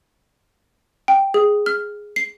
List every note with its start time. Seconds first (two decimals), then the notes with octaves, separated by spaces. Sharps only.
1.08 G5
1.34 G#4
1.66 F6
2.16 C7